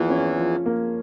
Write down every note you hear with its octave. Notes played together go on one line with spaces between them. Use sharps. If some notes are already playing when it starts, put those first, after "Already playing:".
Already playing: E2 E3 F3 A#3
C#4
F3
A#3